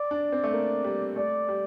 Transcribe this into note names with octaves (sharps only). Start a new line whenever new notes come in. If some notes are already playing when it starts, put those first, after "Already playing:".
Already playing: D5
D4
C4
A3
A#3
G3
A3 D5
G3